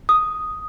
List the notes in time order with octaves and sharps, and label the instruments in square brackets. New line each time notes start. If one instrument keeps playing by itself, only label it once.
[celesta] D#6